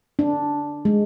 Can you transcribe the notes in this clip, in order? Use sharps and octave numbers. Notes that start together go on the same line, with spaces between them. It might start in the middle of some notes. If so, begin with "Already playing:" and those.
D4
G#3